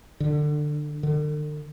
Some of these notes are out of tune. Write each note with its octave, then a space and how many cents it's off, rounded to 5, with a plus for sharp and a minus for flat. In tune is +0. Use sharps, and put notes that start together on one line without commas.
D3 +20
D3 +40